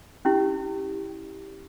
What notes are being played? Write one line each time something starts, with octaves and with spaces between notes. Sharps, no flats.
C#4 E4 G4